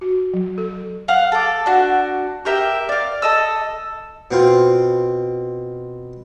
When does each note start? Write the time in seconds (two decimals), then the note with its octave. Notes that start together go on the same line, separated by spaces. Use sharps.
0.01 F#4
0.33 F#3
0.58 A4
1.08 F5 F#5 F6
1.32 A4 D6
1.66 D4 F#4
2.45 G4 A#4 E5 G5
2.89 D5 F5
3.22 A4 D#5 E6
4.31 B2 C4 F4